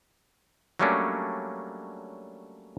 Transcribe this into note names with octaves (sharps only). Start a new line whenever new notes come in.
F#3 G3 A3 A#3 C#4 D4